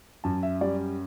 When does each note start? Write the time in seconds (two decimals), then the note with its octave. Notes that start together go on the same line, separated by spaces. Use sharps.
0.24 F#2 A5
0.43 E5
0.61 G3 D5